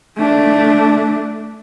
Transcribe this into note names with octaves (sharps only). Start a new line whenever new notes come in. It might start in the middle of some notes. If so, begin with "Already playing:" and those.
A3 D4